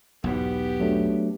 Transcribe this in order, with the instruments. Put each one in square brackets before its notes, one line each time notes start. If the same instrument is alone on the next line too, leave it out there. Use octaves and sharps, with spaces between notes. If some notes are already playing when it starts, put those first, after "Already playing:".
[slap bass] B1 E2 G#2 [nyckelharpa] B3 G4
[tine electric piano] F#3 A3 D4